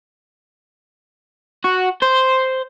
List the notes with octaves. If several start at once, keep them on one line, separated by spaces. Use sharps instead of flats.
F#4
C5